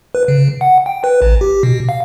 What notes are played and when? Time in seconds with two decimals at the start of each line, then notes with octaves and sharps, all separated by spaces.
0.15 B4
0.28 C#3
0.61 F#5
0.86 G5
1.04 B4
1.22 A1
1.41 G4
1.63 B2
1.89 F5